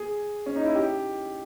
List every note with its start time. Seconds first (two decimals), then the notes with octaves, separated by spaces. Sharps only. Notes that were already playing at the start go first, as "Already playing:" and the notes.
Already playing: G#4
0.46 C#4
0.56 D#4
0.65 E4
0.75 G4